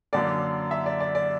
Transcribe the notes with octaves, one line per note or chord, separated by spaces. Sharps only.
F#2 D3 A#3 D5
E5
D5
D5
D5